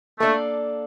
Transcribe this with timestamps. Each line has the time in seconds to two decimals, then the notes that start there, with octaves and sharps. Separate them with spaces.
0.20 A3 A#3 D4 A4 D5 F5